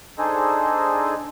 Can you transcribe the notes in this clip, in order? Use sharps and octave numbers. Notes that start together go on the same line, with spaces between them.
D4 D#4 G#4 A4 C5 D#5